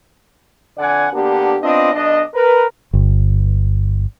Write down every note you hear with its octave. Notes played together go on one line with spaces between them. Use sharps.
F2 D3 D5 F#5 G#5
D3 A#3 B3 D4 G4
B3 C4 D4 F4 D#5
B1 D4 D#5
A#4 B4
G1